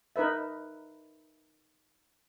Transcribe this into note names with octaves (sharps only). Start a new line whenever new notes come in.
D#4 A#4 B4 E5